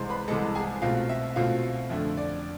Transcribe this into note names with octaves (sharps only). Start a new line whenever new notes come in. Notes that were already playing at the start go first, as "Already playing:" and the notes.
Already playing: C2 C3 E3 G#3 C5 C6
B4 B5
C2 C3 E3 G#3 A4 A5
G#4 G#5
B2 A3 C4 F4 F5
E5
B2 A3 C4 F4 F5
F2 D3 A3 E5
D5